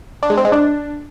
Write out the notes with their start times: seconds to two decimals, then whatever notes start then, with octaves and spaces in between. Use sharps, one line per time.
0.23 D4
0.30 G#3
0.37 C4
0.45 G#3
0.52 D4